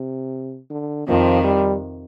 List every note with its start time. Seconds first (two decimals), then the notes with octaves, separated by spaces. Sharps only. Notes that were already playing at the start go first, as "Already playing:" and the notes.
Already playing: C3
0.70 D3
1.07 F2 C3 D#3 F3
1.43 G3